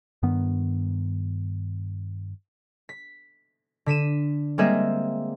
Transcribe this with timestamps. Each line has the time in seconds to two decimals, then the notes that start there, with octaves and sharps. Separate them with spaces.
0.23 G2 D#3 B3
2.89 B6
3.86 D3 B6 D#7 E7
4.58 G3 G#3 A#3 C4 G#4 E5